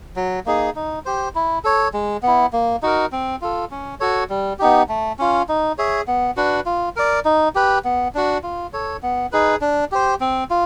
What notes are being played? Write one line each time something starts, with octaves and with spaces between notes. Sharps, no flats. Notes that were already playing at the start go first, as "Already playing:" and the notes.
F#3
A#3 D#4 G#4
D#4
G4 C5
E4
A4 C#5
G#3
B3 E4
A#3
D#4 F#4 A#4
C4
F4 A4
C#4
F#4 A4 C#5
G3
B3 D#4 G4
A3
C#4 F4
D#4
G#4 C#5 E5
B3
D4 F#4 B4
F4
A#4 D5
D#4
G4 B4
B3
D4 F#4
F4
A4 C#5
B3
D#4 G#4 B4
D4
G4 C5
C4
F4